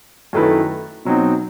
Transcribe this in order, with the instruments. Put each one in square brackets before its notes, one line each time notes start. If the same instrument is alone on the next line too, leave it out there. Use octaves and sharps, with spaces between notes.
[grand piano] F#2 D#3 A3 E4 B4
B2 F#3 C4 D#4